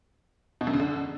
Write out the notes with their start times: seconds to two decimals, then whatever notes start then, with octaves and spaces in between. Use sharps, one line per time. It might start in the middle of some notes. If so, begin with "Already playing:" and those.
0.61 B2
0.67 F#2
0.73 C#3
0.80 D3